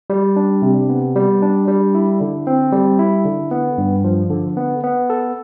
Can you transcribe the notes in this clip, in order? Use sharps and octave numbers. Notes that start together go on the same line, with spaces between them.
G3
D4
C3
B3
G3
D4
G3
E4
D3
C4
G3
E4
D3
B3
G2
F3
D3
B3
B3
A4